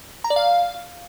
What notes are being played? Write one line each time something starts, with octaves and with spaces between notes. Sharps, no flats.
A#5
D5
F5